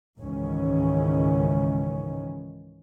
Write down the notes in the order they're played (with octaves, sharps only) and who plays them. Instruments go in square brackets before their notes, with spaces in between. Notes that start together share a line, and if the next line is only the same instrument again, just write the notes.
[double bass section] C#2 G#2 D#3 E3 C#4